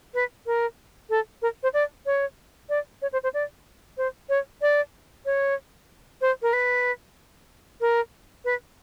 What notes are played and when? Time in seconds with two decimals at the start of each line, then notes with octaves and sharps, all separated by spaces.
0.14 B4
0.46 A#4
1.10 A4
1.42 A#4
1.63 C5
1.74 D5
2.06 C#5
2.69 D5
3.02 C#5
3.12 C5
3.23 C5
3.34 D5
3.97 C5
4.29 C#5
4.61 D5
5.26 C#5
6.21 C5
6.42 A#4
6.53 B4
7.81 A#4
8.45 B4